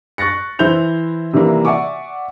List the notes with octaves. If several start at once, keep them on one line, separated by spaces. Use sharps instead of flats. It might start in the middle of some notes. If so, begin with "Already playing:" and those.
C#6 F#6 A6 A#6 C#7
E3 E4 C5 G6 F7
C3 D#3 E3 G3 A#3
D5 E5 F#5 G#5 C#6 D6